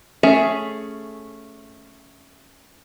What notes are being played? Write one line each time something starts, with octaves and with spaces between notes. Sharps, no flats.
A3 C#4 G#4 E5